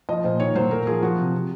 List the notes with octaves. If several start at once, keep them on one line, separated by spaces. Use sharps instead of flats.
F3 D#5
A#2 C5
D#3 C#5
F#3 C5
A#2 A#4
F3 G#4
F3 F#4
C3
C3